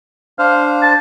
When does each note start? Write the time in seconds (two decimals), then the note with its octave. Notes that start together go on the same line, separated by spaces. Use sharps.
0.39 D4 C5 F5
0.83 A5